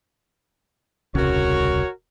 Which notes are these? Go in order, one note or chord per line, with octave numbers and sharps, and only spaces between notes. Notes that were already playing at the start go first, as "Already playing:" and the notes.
D#1 C2 C#3 F#4 A#4 C#5